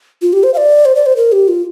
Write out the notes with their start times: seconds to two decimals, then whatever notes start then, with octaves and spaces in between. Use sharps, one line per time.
0.22 F4
0.33 G4
0.43 C5
0.54 F5
0.57 D5
0.85 C5
0.95 D5
1.06 C5
1.17 A#4
1.32 G4
1.48 F4